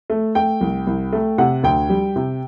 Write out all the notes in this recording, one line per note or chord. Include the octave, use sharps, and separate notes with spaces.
A3
A3 G5
C2
C2
A3
C3 F#5
D2 G5
G3
C3